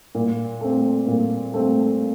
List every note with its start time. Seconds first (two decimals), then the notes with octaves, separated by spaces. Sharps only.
0.15 A#2
0.61 A3 C4
1.07 A#2
1.54 A3 C4